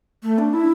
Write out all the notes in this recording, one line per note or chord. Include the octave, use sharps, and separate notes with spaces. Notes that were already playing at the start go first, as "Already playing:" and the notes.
A3
D4
E4